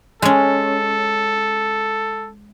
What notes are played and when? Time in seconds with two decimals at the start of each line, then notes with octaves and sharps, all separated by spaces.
0.22 G#3 C#4 A4